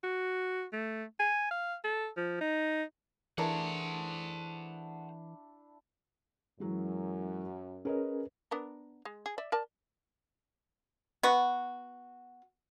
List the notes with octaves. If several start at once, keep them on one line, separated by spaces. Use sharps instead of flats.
F#4
A3
G#5
F5
A4
F3
D#4
E3 A3 D4 E4 G#4 A#4 C5 F#5
F#2 E3 F#3 G#3
C#4 G#4 A#4 B4 C#5 D#5
B3 D4 A#4
G#3
G#4
D5 E5
A#4 D5 A5
B3 F#4